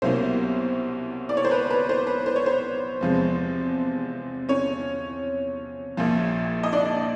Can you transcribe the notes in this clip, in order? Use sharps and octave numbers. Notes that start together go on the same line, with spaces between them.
C2 B2 F#3 A#3 C#4 C5
D5
C#5
C5
B4
B4
C5
B4
C5
C#5
C5
E2 C3 F3 G#3
C#4 C#5
A#1 A#2 F3
D#5
D4 D5